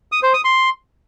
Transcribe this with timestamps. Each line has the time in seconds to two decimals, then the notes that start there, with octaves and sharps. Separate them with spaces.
0.12 D#6
0.23 C5
0.34 D#6
0.44 C6